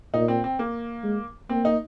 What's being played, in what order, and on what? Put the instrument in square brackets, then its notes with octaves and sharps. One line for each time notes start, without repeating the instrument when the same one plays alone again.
[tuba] A#2 [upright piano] D#4
[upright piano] C4
C4
A#3
[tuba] G#3
[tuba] A#3 [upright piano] C4
[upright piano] D#4